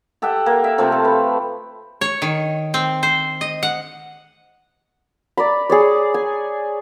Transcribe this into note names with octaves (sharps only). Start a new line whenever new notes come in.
G4 A4 E5 F#5
A#3
E5
C3 F3 A3 C5
A4 F5
B4
C#5
D#3
C4
C5
D#5
F#5
D5 A#5 B5
G#4 C#5 D5
G#5